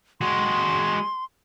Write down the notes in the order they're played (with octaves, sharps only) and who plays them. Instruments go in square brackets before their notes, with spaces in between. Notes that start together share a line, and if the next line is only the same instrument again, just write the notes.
[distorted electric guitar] G#3 F#4 [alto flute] C6